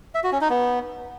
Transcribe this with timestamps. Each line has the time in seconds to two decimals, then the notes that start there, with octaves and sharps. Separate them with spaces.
0.15 E5
0.23 F#4
0.32 C#4
0.41 D#4
0.50 B3